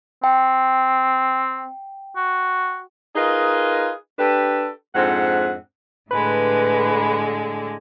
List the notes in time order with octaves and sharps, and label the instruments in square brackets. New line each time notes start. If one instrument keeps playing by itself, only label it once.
[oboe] C4 [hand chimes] G5
[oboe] F#4
[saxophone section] D#4 F4 G#4 A#4 B4 D#5
D4 G4 A4 B4
F2 G#2 C4 D4 F#5
[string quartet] A2 D3 G#3 [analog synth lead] B4